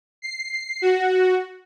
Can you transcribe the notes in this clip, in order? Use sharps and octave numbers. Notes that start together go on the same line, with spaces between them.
C7
F#4